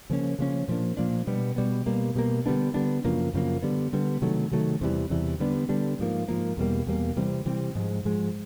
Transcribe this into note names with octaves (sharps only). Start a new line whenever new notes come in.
C#3 F3 A#3 C#4
C#3 F3 A#3 C#4
A#2 F3 A#3 D4
A#2 F3 A#3 D4
B2 G3 B3
B2 G3 B3
B2 G3 A#3
B2 G3 A#3
D3 G3 B3 D4
D3 G3 B3 D4
F#2 C#3 F3 A#3
F#2 C#3 F3 A#3
D3 G3 B3
D3 G3 B3
C3 D#3 F#3 A3
C3 D#3 F#3 A3
E2 C3 E3 G3
E2 C3 E3 G3
D3 G3 B3 D4
D3 G3 B3 D4
G#2 F3 A#3
G#2 F3 A#3
E2 B2 G3 A#3
E2 B2 G3 A#3
C3 E3 G3 C4
C3 E3 G3 C4
G#2 F3 G#3
G#2 F3 G#3